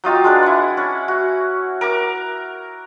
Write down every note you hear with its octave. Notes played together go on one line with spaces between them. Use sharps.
F#3 D#4 F4 G4
G#3 D4 B4
E4 F#5
C#4
F#4
A#4 A#5 D6